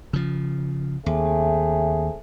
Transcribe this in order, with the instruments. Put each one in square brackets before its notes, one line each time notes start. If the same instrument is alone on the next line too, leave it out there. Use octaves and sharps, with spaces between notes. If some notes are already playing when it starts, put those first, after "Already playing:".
[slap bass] C#3 F3
[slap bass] D#2 [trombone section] C3 A3 G#4